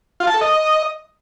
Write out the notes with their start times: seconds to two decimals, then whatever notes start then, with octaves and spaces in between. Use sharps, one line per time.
0.20 F4
0.27 A5
0.34 A4
0.41 D#5